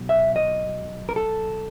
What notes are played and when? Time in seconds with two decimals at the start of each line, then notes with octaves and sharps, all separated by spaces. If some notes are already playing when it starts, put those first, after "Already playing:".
Already playing: B1 B2
0.09 E5
0.36 D#5
1.09 A#4
1.16 A4